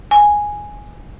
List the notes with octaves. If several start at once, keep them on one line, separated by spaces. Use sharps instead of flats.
G#5